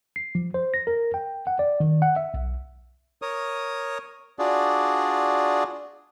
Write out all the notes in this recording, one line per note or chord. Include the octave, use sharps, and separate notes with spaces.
C7
F3
C5
A#6
A#4
G5
F#5
D5
D#3
F#5
E5
B1
A#4 C#5 D#6
D4 F4 F#4 G#4 D5